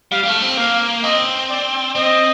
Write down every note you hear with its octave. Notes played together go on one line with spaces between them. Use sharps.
G3 F5
G3
A3
C4
A#3 F5
C4 D#5
D5
C4 D#5